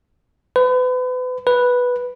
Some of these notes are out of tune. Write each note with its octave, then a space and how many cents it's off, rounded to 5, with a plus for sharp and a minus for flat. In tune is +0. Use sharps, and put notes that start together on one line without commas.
B4 +35
B4 -5